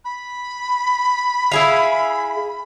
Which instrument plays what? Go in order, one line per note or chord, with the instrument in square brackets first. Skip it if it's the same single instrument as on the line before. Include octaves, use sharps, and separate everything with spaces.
[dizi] B5
[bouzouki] E4 G#4 F5